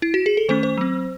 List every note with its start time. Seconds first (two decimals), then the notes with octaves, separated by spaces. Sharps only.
0.02 E4
0.14 F#4
0.26 G#4
0.37 A4
0.49 D#3 A3 C#4 C5
0.63 C5
0.77 F#3 C4